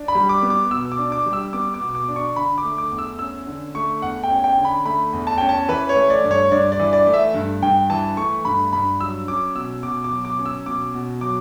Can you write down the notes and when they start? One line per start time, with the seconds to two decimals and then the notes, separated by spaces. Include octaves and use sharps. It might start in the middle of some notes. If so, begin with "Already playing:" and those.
Already playing: D4
0.08 B5
0.15 G3
0.29 D6
0.42 B3
0.50 D6
0.71 B2 E6
0.92 D6
0.98 D4
1.12 D6
1.26 G3
1.33 E6
1.53 B3 D6
1.74 D6
1.81 B2
1.95 D6
2.08 D4
2.16 C#6
2.36 D3 B5
2.58 D6
2.64 A3
2.78 D6
2.92 E2
2.98 E6
3.19 C#4 E6
3.47 D3
3.75 A3 C#6
4.02 E2 F#5
4.23 G5
4.30 C#4
4.44 G5
4.58 D3
4.65 B5
4.85 A3 B5
5.13 E2
5.27 A5
5.38 C#4 G5
5.49 A5
5.68 E3 B4
5.89 C#5
5.96 A3
6.10 D5
6.24 G2
6.31 C#5
6.51 G2 D5
6.72 D5
6.79 E3
6.93 D5
7.07 A3
7.14 E5
7.34 G2
7.62 G2 G5
7.90 E3 A5
8.17 A3 C#6
8.45 G2 B5
8.73 G2 B5
9.00 F#3 E6
9.28 C#4 D6
9.55 B2 E6
9.83 B2 D6
10.04 D6
10.11 F#3
10.25 D6
10.39 C#4
10.46 E6
10.66 B2 D6
10.94 B2
11.21 F#3 D6